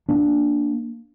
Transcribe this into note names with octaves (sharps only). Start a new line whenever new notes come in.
A#3 D4